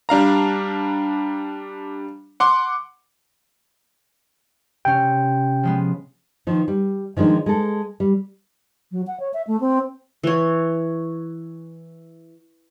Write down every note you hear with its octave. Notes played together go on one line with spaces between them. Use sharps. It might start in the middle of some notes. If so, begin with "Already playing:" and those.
G3 D4 F5 A#5
F#5 C6 D6
C3 C#4 G5
F3 G#3 B3
D#3 F3
G3
D#3 F3 G#3 D4 D#4
G#3 A4
G3
F#3
F#5
C#5
E5
A3
C4
E3 C#5